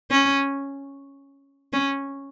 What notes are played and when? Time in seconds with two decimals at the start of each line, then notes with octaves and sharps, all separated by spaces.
0.11 C#4
1.73 C#4